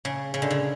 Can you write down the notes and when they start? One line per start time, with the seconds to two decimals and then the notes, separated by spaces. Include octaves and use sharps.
0.05 C#3
0.34 C#3
0.42 D3
0.51 C#3